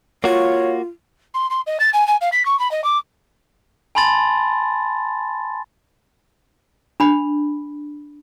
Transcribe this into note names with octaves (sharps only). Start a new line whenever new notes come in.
A#3 F4 F#4 C#5
C6
C6
D#5
A6
G#5
G#5
F5
B6
C#6
B5
D#5
D6
G#5 A5 B5 C6 A6
D4 B5